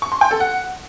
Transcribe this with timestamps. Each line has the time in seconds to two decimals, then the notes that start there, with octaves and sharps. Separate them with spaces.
0.02 C#6
0.12 C6
0.21 G5
0.31 A4
0.40 F#5